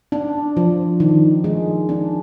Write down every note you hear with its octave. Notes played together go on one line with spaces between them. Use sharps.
D4
F3
D#3
G#3
D4